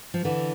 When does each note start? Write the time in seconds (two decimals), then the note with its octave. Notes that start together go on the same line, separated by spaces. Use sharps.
0.14 F3
0.25 D3 E3